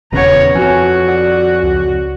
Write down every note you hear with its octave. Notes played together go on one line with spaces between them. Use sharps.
D#1 E2 C#3 B4 C#5 F#5 A#5
F2 F#4 C#5 G#5
D5 F#5
C#2